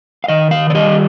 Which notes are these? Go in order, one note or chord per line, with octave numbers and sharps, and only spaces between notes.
F5
D#3 D#5
F5
D5
G3 D#5